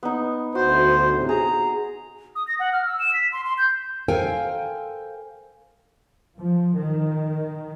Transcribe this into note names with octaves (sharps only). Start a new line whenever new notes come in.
B3 D#4
D2 F#4 C5
A2 C3
G#4 A#5
D#6
A#6
F#5
F6
E6
E7
B6
C6
C6
G6
A4 A#4 C5 F5 G5 G#5
F3
D#3